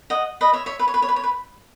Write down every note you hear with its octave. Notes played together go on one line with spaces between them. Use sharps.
D#5 F#5
B4 D#5
C#5 E5
C#5 E5
B4
C#5
B4
C#5
B4
C#5
B4